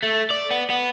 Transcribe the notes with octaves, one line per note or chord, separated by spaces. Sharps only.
A3
D5
B3
B3